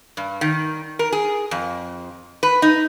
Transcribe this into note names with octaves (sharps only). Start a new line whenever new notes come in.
G2
D#3
A#4
G#4
F2
B4
D#4